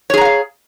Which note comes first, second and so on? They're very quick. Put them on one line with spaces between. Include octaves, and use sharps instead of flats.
C#5 G#4 A#5 F#5 F5